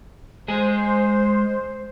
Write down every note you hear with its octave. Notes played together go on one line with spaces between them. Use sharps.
G#3 G#4 C5